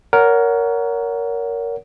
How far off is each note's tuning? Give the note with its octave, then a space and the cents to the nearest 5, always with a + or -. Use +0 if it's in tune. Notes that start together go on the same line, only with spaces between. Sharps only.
A#4 +0 C#5 +30 F#5 +0